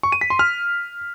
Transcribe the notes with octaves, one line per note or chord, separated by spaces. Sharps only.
C#6
D#7
B6
C6
F6